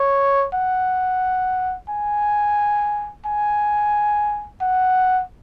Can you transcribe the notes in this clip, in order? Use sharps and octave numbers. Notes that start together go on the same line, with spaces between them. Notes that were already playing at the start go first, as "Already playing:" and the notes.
Already playing: C#5
F#5
G#5
G#5
F#5